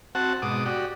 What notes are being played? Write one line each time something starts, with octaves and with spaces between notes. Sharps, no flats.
C4 F#4 F#5 A5
G#2 B2 D6 D#6
F#4 G4 D5